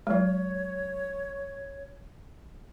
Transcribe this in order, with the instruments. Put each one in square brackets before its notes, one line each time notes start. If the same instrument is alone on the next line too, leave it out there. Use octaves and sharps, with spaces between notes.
[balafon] F#3 G#3 [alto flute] C#5